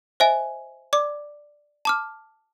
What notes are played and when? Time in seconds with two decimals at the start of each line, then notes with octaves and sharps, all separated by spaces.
0.20 C5 D#5 E5 G#5
0.93 D5 D6
1.85 A5 D6 F6